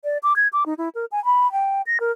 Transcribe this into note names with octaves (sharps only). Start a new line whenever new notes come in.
D5
D6
G#6
D6
D#4
E4
A#4
G#5
B5
G5
A#6
A#4